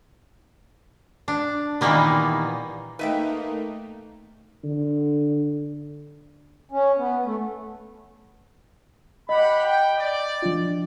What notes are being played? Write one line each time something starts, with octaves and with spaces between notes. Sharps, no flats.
D4
A#2 D#3 E3 G3 A#3 B3
A3 A#3 D#4 B4 E5 G5
D3
C#4
B3
A3
G4 D#5 F#5 B5
G5
D5
F3 D4 F4